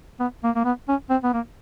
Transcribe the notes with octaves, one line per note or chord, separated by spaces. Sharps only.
B3
A#3
A#3
B3
C#4
C4
B3
A#3